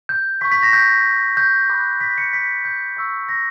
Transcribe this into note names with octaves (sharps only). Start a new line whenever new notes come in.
G6
C#6 G6 B6
B6
A#6
G6
G6
B5 D6 F#6
B6
C#7
B6
G6
C#6 E6 G6
A#6